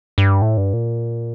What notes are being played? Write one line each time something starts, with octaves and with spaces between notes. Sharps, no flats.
G2
A2
G2
A#2